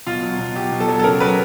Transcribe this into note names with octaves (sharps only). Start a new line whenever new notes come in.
B2 F4
F#3
B2
F#3 G4
B2
A4
F#3
A4
C#3 A#4
F#3 B4